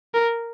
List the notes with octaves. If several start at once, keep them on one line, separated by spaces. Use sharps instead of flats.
A#4